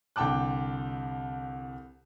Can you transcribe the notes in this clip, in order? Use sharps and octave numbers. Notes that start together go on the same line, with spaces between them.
C2 D3 G5 A5 D6 F#6